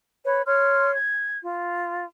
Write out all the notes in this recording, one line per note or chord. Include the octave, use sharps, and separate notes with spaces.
B4 C#5
C#5 C6 F6
G#6
F4